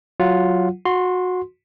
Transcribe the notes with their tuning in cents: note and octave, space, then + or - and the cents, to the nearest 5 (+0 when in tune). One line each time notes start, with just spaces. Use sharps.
F#3 +0 F4 +0 F#5 -10
F#4 -20 C6 +0